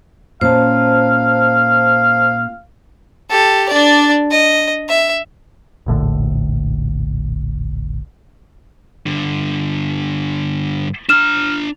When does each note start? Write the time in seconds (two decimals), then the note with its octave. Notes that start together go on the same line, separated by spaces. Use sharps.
0.41 A#2 C#4 C5 F5 A5
3.30 G4 A4
3.69 D4 D5
4.31 D#5
4.89 E5
5.86 E1 A#1 A2 D3
9.06 G2 D3
11.09 D4 A#5 F6 E7